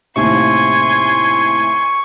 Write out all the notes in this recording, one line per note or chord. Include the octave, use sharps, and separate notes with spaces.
D#2 A2 C3 G#5 C6 C#6